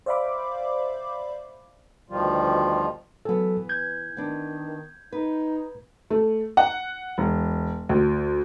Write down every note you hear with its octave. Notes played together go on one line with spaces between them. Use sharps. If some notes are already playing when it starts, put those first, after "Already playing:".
C5 D5 E5 F5 B5 D6
D2 B2 D#3 F3 G3 F4
E3 F#3 B3 A4
G6 G#6
D#3 B3 D4
D#4 B4
A3
F#5
E1
D2